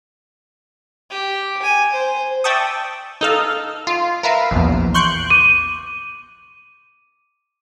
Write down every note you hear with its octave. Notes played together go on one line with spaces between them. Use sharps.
G4
G#5
C5
D5 E5 G5 A5 C#6 D#6
D#4 A4 F5
F4
A#4 B4 E5 F5
A#1 E2
C6 C#6 F#6 G6 C#7 D7
D6 D#7